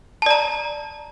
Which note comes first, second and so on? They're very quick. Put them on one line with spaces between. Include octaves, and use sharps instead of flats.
A5 D5 A#5